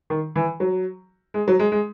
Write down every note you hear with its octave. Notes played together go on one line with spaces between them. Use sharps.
D#3
E3
F#3
G#3
F#3
G#3
G#3